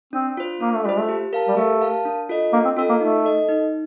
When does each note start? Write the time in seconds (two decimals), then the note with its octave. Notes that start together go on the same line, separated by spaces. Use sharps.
0.13 C4 D4
0.37 F4 C5
0.60 A#3 D4
0.74 A3
0.85 G3 F4 C5
0.99 A3
1.09 G4
1.33 A#4 F5 A5
1.48 G3
1.57 A3 G4
1.81 A#4 F5 A5
2.05 D4
2.29 F4 A4 D#5
2.53 A#3 D4
2.65 C4
2.77 C4 F4 A4 D#5
2.89 A#3
3.01 A3 D#4
3.25 A4 D#5
3.49 D#4